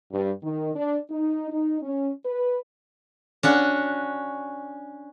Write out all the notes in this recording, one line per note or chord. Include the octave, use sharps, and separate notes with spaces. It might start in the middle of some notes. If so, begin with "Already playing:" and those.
G2
D#3
D4
D#4
D#4
C#4
B4
C#4 D4 F#4